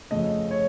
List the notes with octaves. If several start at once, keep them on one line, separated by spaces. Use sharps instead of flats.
F2 C#3 A3 D#5
C#5